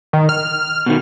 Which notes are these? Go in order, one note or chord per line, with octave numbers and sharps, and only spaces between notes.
D#3
F6
B2 D#3